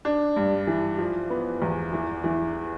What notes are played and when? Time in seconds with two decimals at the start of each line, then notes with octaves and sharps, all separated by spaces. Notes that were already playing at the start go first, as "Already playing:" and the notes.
0.05 D4
0.36 G2
0.67 E3
0.98 F3
1.30 B3
1.62 E2
1.93 E3
2.24 E3